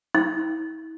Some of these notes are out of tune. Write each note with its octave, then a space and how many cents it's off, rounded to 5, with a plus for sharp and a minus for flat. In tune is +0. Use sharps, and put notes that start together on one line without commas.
E4 -40